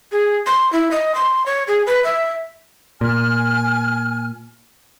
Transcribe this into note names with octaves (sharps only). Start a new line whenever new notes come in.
G#4
C6
E4
D#5
C6
C#5
G#4
B4
E5
A#2 G#5 F6